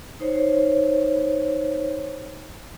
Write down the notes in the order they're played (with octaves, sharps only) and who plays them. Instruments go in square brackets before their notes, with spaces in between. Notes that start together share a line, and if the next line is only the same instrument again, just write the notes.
[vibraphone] D#4 C5 C#5